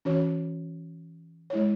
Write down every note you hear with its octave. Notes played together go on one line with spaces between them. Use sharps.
E3 C#4 F#4 C#5
G#3 E4 C#5